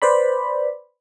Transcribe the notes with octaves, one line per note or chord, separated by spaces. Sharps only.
B4 C5 D5 B5